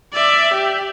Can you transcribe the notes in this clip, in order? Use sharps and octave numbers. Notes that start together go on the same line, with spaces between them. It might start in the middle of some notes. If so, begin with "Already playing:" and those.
D5 E5
G4